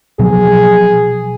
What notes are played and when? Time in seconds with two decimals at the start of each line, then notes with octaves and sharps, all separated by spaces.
0.19 B2 F3 F#3 G#4